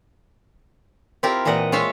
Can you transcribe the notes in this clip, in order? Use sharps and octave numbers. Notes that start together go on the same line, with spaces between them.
C4 E4 F4 G4 A#4
A#2 E3 A#3 D#5 F#5
G#3 F4 C#5 E5 F5